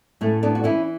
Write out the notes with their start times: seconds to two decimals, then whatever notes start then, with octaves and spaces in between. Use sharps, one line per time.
0.21 A2 A3 C#4
0.43 B3 D4
0.55 F#4
0.64 E3 C#4 E4